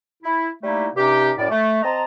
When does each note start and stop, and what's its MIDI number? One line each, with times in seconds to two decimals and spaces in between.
0.23 0.48 64
0.62 0.86 55
0.62 0.86 57
0.62 0.86 58
0.62 0.86 63
0.62 0.86 64
0.96 1.31 43
0.96 1.31 48
0.96 1.31 61
0.96 1.31 63
0.96 1.31 67
1.38 1.46 42
1.38 1.46 45
1.38 1.46 61
1.38 1.46 74
1.50 1.80 57
1.83 2.04 60
1.83 2.04 75
1.83 2.04 81
1.83 2.04 82